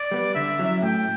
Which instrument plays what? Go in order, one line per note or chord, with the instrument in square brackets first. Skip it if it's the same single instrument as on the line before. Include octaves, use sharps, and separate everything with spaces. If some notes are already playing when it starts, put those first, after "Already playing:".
Already playing: [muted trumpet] D5
[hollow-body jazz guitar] G3 B3
[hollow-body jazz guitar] D3 [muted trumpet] E5
[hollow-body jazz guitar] F#3 C#4 E4
[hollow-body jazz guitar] A2 [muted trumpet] G5